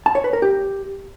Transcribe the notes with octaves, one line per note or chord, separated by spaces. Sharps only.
A5
C#5
B4
A#4
G4